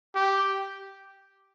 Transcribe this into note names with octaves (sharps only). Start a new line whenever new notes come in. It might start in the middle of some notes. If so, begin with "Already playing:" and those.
G4